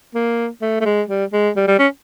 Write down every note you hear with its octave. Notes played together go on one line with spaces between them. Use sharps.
A#3
A3
A3
G#3
G3
G#3
G3
G3
C#4